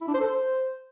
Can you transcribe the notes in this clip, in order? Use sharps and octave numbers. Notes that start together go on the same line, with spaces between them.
E4
D4
C5
A4
C5